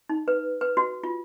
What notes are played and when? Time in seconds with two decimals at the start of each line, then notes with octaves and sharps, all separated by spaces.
0.09 D#4
0.28 B4
0.61 B4
0.77 F#4
1.04 F4